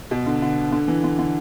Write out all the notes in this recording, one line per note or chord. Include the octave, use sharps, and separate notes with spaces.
B2
D3
D3
D3
E3
D3
D3